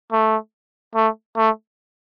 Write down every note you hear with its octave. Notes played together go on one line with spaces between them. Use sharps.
A3
A3
A3